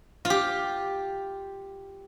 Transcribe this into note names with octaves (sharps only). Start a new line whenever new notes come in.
F4
G4